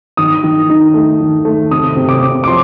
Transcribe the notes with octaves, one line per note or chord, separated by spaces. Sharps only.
D#3 D#6
D#3
D#4
A3
D#3
A3
C3 D#6
C3
D6
C3
D6
F3 C6